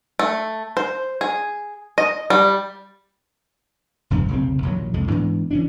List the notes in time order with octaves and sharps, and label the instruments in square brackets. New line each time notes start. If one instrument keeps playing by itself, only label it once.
[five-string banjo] A3
C5
G#4
D#5
G3
[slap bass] F#1 E2 G2 F3
F1 B1 C#3 C4
A#1 D#2 A#2 F#3
C2 F2 D3 G#3
G#2 E3 B3 D4
E3 C#4 D4